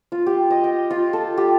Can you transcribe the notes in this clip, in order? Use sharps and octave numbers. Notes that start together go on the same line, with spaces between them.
F4
G4
D#5
G5
F4
A4
G4